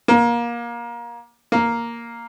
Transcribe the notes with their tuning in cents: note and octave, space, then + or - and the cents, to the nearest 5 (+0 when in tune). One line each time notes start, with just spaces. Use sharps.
A#3 +25
A#3 +0